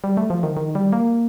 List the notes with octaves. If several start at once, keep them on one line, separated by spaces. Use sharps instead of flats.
G3
A3
F3
D#3
D#3
G3
A#3